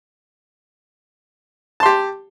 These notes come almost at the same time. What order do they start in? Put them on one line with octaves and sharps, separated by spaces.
A5 C6 G4